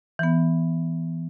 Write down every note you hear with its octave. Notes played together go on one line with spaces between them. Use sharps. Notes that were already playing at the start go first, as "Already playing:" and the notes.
E3 B3